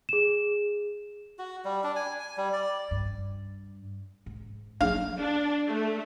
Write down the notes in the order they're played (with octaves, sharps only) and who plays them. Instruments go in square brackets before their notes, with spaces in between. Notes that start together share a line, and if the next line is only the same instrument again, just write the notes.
[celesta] G#4 E7
[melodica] F#4
G3
D4
G#5
G#5
G3
D5
[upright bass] G2
G#2
[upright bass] F#3 A#3 [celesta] D4 D#4 G#4 [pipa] F5
[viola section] D4
A3